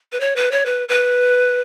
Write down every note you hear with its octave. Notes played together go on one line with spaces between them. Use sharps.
B4
C#5
B4
C#5
B4
B4